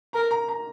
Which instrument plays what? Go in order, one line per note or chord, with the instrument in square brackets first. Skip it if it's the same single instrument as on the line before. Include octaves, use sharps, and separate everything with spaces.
[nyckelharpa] A#4 [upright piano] A#5
[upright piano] A#5
A#5